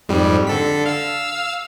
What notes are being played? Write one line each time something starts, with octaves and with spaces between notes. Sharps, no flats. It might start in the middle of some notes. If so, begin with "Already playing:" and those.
F2 G#2 G3
D3 A4 B6
F5 E6